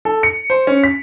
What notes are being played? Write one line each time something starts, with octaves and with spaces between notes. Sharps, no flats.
A4
C#7
C5
C#4
B6